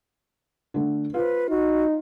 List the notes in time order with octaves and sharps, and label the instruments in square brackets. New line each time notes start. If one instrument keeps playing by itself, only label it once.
[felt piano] D3 A3
[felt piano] F4 C5 [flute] B4
[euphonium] D#4 [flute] F#4